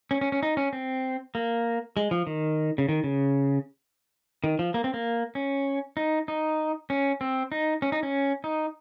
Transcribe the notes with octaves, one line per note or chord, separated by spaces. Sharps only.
C#4
C#4
C#4
D#4
C#4
C4
A#3
G#3
F3
D#3
C#3
D#3
C#3
D#3
F3
A#3
C4
A#3
C#4
D#4
D#4
C#4
C4
D#4
C#4
D#4
C#4
D#4